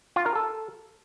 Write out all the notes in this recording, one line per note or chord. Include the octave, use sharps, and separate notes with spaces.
F4
A#4
A4